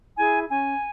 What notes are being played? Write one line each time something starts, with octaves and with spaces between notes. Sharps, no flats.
E4 G#4 G#5
C#4 G#5